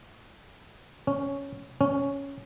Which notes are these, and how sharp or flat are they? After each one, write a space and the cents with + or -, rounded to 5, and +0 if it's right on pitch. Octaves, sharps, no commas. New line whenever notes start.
C#4 +5
C#4 +5